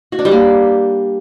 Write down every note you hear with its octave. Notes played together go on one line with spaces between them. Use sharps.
F#4
D4
G3
A#3